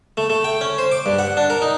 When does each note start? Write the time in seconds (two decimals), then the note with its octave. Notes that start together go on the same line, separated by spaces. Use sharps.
0.17 A3
0.30 A3
0.44 G5
0.61 C#4
0.78 C5
0.92 D6
1.06 G2
1.19 F#5
1.37 D4
1.50 A#4
1.62 D#4